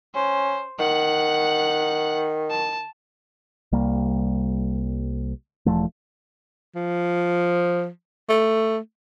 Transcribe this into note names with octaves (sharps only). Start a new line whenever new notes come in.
C#4 C5
D#3 F#5 F#6
A5
C2 G3 A#3
E1 E2 F3 A3
F3
A3